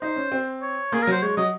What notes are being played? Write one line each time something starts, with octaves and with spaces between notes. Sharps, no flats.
D#4 C5
C#4
C4
C#5
A#3 G#4
A#4
F#3 C5
G#3 C#5
F#3 D#5